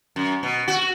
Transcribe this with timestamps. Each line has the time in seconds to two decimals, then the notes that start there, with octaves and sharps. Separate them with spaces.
0.16 F#2
0.43 B2
0.68 F#4